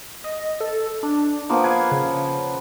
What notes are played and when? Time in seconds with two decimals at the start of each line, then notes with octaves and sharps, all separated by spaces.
0.24 D#5
0.61 A4
1.03 D4
1.49 F3 A#3 B3
1.64 B4 F5 G#6
1.92 C#3